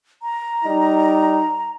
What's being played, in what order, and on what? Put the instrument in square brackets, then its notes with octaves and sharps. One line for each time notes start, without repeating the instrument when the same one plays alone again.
[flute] A#5
[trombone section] G3 D#4